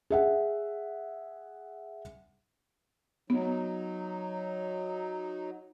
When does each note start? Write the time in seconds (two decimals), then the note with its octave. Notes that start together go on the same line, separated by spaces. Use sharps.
0.10 G#4 E5 F#5
3.30 F#3 B3 D#4